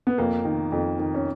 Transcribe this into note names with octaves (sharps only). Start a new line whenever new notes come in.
B3
F2 A#3
D#3
F2
D#3
C#4